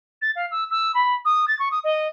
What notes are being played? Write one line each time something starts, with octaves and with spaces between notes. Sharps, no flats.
A6
F5
E6
E6
B5
D#6
A6
C#6
D#6
D#5